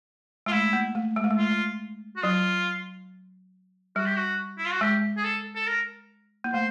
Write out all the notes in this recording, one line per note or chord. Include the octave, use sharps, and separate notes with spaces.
G#3 F4
A3 E4
A#3
A3
G#3
A3
G#3
F4
F#4
F#3 F4
G3 F#4
G4
F#4
E4
F4
F#4
G#3 G4
G#4
A4
A4
A#4
A#3
A3 C5